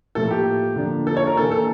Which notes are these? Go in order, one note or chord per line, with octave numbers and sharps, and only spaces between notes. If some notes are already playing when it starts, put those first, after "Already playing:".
A2 F3 A#3 A4
G4
D3 F3 A#3 D4
A4
C#5
A#4
E3 A#3 D4 A4
A4